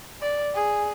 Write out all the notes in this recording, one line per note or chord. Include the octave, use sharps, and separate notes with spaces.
D5
G#4